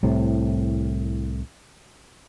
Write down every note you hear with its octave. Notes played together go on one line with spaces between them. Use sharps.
C2 A2 C3